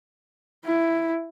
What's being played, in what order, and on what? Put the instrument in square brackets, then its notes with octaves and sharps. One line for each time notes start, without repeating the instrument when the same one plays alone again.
[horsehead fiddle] E4